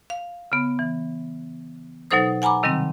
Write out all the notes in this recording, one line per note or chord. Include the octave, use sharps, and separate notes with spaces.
F5
C#3 B3
E3
B2 F#3 D#4 A4 C5 D#6
F#5 G#5 A#5 B5 D6
C3 D#3 F#3 G3 C4